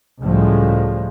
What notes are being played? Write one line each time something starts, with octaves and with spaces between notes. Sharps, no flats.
C#2 A2 F3 G3 G#3